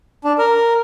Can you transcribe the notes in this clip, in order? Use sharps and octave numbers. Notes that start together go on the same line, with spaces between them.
D4
A#4